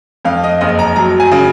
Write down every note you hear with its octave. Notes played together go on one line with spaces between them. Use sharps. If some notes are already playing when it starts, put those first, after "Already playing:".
F2 F5
D#5
F#1 D#5
A#5
F#3 A#5
G#5
C#3